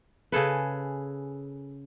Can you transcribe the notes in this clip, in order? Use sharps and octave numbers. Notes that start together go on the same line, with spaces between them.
C#3 G#4 A4 B4